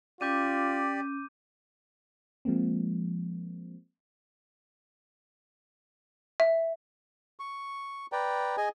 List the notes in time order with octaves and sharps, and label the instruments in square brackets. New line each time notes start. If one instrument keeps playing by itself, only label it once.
[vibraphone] C#4 [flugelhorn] F4 [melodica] G4 D5 [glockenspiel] D6 G6 D#7
[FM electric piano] F3 G#3 A#3 C4
[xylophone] E5
[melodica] C#6
B4 D5 G5 A#5
G#4 D#5 G#5